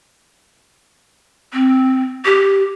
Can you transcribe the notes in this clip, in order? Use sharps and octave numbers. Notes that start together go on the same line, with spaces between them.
C4
G4